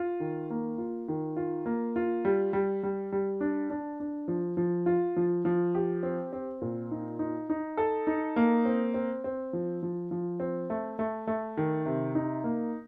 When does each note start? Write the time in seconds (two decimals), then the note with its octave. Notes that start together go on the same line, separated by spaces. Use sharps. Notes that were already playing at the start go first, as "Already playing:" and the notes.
Already playing: F4
0.20 D#3
0.50 A#3
0.78 F4
1.08 D#3
1.37 F4
1.66 A#3
1.96 F4
2.25 G3
2.53 G3
2.83 G3
3.12 G3
3.41 D4
3.70 D4
4.00 D4
4.28 F3
4.57 F3
4.86 F4
5.16 F3
5.45 F3
5.75 G4
6.03 C4
6.33 C4
6.62 A#2
6.91 D#4
7.19 D#4
7.50 D#4
7.77 A4
8.07 D#4
8.36 A#3
8.65 C4
8.94 C4
9.24 C4
9.53 F3
9.83 F3
10.11 F3
10.40 C4
10.70 A3
10.99 A3
11.27 A3
11.57 D#3
11.86 C3
12.15 D#4
12.44 A#3